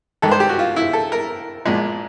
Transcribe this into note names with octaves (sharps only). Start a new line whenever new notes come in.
G2 D#3 G#3 A4
C5
G4
F#4
F4
E4
A4
A#4
A#1 A#2 F3 G#3